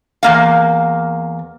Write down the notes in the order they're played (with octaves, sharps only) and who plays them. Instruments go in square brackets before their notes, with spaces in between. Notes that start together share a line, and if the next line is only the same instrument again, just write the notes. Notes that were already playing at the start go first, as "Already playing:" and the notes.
[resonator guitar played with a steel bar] E2 A#3 F5